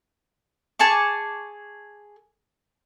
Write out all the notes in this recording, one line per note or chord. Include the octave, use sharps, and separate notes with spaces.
G#4 A5 C#6 D6